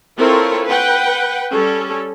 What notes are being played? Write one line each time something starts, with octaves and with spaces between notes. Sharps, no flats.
C4 E4 F4 A4 A#4 C#5
B4 F#5 G5
G3 C#4 A4